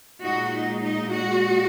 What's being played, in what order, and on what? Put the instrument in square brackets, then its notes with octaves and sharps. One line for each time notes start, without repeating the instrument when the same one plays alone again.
[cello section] A#2 G#3 D#4 F#4
D#4
D#4
F#4